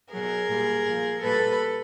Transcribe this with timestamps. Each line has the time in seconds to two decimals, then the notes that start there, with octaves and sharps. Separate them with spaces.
0.13 B2 F#3 G#4 A#4
0.50 A#2 G3
0.87 A#2 F3
1.23 A#2 G3 A4 B4